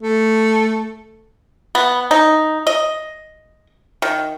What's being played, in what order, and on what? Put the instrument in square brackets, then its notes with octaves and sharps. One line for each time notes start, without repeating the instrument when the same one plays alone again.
[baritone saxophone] A3
[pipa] B3
D#4
D#5
D#3